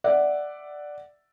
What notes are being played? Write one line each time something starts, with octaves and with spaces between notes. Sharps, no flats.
D5 E5 F#5